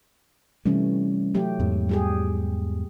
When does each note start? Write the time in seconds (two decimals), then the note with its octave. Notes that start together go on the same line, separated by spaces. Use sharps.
0.65 C3 E3 G3 A3 C#4
1.34 F#3 A3 G4
1.60 E2 G#2
1.89 G3 G4 G#4